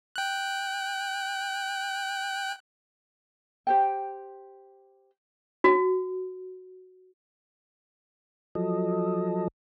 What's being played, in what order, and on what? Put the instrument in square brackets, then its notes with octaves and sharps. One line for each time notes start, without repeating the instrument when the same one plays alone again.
[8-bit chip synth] G5 F#6
[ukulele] G4 C5 G5
[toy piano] F#4
[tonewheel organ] F3 F#3 A4 D#5